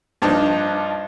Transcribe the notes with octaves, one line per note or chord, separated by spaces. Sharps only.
G2 F3 D4 D#4